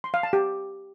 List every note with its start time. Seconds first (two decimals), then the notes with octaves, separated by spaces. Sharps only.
0.04 C6
0.14 F5
0.23 A5
0.33 G4